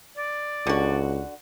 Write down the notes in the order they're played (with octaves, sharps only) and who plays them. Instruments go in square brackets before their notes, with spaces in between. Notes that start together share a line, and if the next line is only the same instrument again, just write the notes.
[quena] D5
[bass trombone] C#2 [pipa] D3 F#4